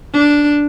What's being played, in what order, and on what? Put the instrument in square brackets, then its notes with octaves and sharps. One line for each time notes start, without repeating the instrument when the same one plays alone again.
[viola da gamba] D4